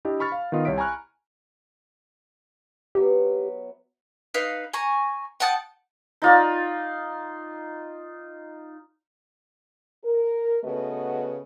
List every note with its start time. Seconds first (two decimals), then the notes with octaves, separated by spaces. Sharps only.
0.05 D4 E4 G4 D#5
0.20 B5 C#6 F6 A6
0.32 F5
0.52 D#3 B3 F4 D#5
0.65 C2 C#5 E5 B6 D7
0.78 G#5 A#5 B5 C#6 F6 F#6
2.95 F#3 B3 G4 E5
4.34 D#4 B4 F5
4.74 G#5 A#5 C#6
5.40 F#5 G5 A5 D#6
6.22 D#4 F4 D5
10.04 A#4
10.64 C#3 A3 B3 F#4 B4 D#5